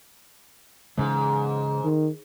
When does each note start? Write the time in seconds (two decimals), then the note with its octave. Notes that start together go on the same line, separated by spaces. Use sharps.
0.97 G#2 C#3 E3 G#3
1.84 D#3